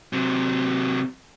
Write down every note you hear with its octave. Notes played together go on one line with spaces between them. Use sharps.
C3 F#3